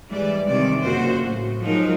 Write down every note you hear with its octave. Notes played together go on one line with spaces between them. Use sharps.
G#2 E3 G3 D5
C3 D#3 D5
F#2 A#2 C#3 F#4 C5
A2
F3 F#3 G#3 D#4 A#4